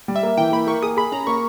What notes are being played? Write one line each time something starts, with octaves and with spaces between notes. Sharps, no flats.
G3
E5
A#3
E3 G5
A#3 B5
A#3 C#6
G#4 D#6
G#4 B5
C#4 A#5
A#3 C#6